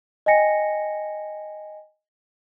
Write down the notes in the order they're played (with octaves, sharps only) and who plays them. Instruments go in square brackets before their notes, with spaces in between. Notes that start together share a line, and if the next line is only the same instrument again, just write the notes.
[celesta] D#5 G5 G#5 A#6 C#7